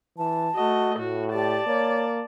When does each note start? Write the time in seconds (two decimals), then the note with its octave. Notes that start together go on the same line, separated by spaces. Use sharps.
0.18 E3 A5
0.56 A3 F#4 D#5
0.98 A2 F#4
1.33 G4 D5 A5
1.67 A#3 C#5